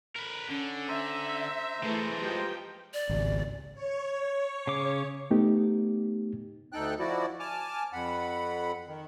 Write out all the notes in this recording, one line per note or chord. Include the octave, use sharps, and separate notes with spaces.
A#4 B4
D3 C#4
C5 E5 A#5
E3 G#3 A3 A4 B4
F3 G4 G5
D5
G#1 C#2
C#5
C#3 D6
A3 B3 D#4 G4
D2 D#4 A4 G5 F#6
F3 E4 F#4 D5
G#5 A5 D6 F6
F2 F#5 B5
D#3